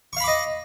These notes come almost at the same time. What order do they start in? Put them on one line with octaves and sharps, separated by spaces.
C#6 F5 B5 D6 D#5